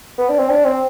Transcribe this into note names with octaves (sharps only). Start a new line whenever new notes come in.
B3
D4
C4
D4
C4